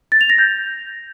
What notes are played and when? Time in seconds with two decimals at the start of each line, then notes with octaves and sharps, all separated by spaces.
0.12 A6
0.21 F7
0.30 A#6
0.38 G6